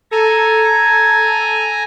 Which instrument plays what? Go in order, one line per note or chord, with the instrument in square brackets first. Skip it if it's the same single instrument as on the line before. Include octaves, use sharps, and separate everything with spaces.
[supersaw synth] A4 [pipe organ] G#5 A#5